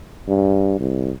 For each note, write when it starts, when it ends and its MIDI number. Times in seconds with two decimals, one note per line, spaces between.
0.28 0.79 43
0.80 1.11 36